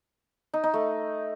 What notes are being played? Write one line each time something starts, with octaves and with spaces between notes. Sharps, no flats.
D#4
D#4
A3